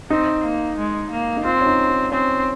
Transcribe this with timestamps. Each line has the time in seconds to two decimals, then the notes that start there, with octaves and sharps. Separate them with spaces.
0.10 C4 D#4
0.44 A#3
0.77 G#3
1.11 A#3
1.37 D#4
1.44 C4 F4
1.61 C#4
1.66 D#4
1.89 D#4
2.12 C4 C#4